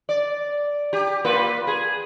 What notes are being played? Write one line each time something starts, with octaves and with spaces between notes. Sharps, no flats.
D5
G4
A#3 F4 B4
G#4